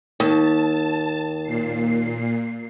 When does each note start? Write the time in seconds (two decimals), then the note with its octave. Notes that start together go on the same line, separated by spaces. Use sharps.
0.20 D#2 A5
1.44 A#2 C7